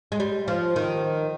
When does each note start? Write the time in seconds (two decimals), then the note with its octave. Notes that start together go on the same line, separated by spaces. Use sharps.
0.12 G#3
0.20 G3
0.48 F3
0.76 D#3